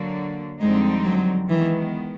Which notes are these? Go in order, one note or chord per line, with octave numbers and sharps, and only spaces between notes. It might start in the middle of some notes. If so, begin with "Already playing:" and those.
Already playing: D3 F#3 A#3
F2 D3 G3 G#3 C4 D#4
F#3
D#3 E3 G#3 B3